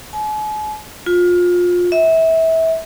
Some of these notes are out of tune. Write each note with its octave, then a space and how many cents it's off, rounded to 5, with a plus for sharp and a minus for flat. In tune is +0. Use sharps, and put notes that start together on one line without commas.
G#5 +45
F4 +25
E5 -25